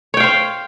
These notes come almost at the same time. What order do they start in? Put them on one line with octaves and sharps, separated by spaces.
C#5 G5 F5 C5